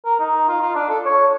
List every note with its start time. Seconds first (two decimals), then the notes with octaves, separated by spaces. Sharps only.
0.05 A#4
0.19 D#4
0.48 F4
0.61 F4
0.75 D4
0.89 A4
1.06 C#5